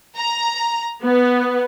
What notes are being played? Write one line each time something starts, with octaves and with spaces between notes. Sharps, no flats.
A#5
B3